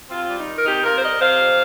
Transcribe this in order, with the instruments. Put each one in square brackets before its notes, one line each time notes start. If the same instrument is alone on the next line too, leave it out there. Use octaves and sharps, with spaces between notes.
[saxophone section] C3 C4 F4
G3
D#4
D#3
A#4
C3 D#4 G4
C3 F4 A#4
C5
G3 A#4 D#5
C3 C5 F5
F2